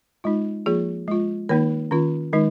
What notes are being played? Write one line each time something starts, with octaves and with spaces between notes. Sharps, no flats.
G#3 D#4 F4
F3 A#3 F4 G#4
G#3 F4
D#3 A#3 D#4 C#5
D#3 C#4 F4
D#3 G#3 D#4